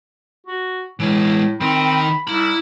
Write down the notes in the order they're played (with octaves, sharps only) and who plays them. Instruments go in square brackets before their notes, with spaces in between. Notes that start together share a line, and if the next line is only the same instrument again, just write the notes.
[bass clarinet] F#4
[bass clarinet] A2 [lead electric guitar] E3 G#3
[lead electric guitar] D#3 A#4 [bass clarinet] C4 [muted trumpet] B5
[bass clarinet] C2 [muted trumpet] A#3 [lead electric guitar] E4 B5